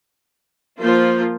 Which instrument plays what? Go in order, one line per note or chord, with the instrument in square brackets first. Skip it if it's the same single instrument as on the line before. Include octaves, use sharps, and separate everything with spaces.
[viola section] F3 A#3 F4 C5